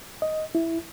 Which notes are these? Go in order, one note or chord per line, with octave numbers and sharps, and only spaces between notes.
D#5
E4